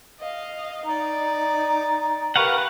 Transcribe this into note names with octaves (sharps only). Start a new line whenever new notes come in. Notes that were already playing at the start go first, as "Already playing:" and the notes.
D#5 F5
D#4 D5 A#5
G4 A#4 B4 F5 F#5 C#6